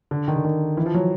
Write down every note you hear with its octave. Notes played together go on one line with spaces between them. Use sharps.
D3
D#3
D3
D#3
E3
F3
F#3